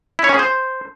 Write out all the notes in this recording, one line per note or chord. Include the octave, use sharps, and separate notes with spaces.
E4
C#5
C#4
G#4
C5